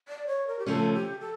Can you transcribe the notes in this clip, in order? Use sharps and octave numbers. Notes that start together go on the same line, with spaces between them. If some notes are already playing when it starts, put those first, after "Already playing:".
D5
C#5
A#4
G4
C#3 F3 A3 C#4 A4
G4
A4